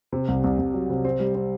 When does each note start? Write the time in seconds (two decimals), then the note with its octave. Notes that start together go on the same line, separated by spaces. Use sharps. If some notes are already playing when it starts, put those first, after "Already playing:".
0.13 C3
0.28 C2
0.44 C2
0.58 C2
0.74 F#3
0.90 C3
1.05 C4
1.20 G3
1.35 C4